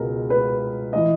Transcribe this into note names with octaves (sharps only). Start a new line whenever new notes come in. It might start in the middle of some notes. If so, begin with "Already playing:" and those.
Already playing: C#2 B2 G#3 A#4
B4
E3 D#5